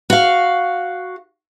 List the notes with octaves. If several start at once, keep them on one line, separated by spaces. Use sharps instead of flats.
F#4 F5